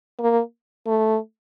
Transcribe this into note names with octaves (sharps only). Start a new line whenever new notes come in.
A#3
A3